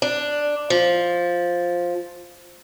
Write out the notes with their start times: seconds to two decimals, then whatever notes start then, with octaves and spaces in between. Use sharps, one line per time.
0.02 D4
0.70 F3